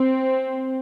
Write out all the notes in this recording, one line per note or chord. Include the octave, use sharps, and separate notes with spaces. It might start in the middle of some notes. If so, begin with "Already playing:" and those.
Already playing: C4